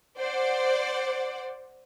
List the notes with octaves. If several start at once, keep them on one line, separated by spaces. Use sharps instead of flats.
C5 D5 F#5